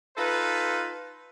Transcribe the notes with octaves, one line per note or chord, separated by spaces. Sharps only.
D#4 F4 A4 B4